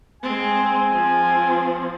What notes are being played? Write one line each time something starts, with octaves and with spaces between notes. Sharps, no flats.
G#3 C4 G#5
F3 C4